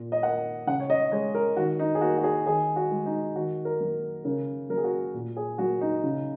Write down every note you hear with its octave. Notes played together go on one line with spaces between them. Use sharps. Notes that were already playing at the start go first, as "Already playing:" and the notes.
Already playing: A#2
D#5
A#3 F#5
C#3 F#5
C#5
D#5
G#3 C#5
A#4
D#3 F#4
D#4
G#4
A#3 F#4
F#4
G#4
D#3 G#4
F#4
G#3
D#4
D#3 F#4
A#4
F#3 A#3
C#3 A#4
F#3 A#3 A#4
G#4
F#4
A#2
G#4
F#3 A#3 F#4
D#4
C#3